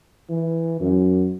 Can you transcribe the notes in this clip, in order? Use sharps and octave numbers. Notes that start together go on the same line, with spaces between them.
E3
F#2